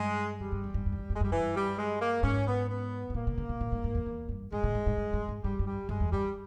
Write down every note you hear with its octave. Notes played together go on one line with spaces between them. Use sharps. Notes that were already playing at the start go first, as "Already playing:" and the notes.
Already playing: G2 G#3
E2 G3
G2
E2
G2
G2
E2
G2
G2
G#3
G2
G3
G2 E3
G3
G#3
A#3
G#2 C#4
B3
B3
G#2
A#2 A#3
B2
C#3
B2
A#2
G#2
G#2
E2
E2
G2
G#2 G#3
A#2
G#2
G#2
G2
G2
G#2
G2 G3
G2
G3
G2 G#3
E2
G2 G3